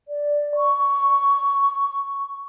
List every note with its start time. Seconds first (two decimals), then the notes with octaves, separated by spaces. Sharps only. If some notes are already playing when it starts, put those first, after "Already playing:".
0.08 D5
0.56 C#6